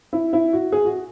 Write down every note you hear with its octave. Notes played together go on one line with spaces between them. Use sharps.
E4
E4
F#4
G#4
F#4